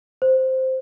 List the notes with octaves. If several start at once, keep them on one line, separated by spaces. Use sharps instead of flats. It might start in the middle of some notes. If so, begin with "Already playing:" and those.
C5